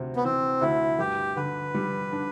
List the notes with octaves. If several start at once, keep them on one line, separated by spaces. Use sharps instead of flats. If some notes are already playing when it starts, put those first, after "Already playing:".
Already playing: D2 C3
B3
E3 C4
D2 E4
G2 G4
D3 B4
G3
D4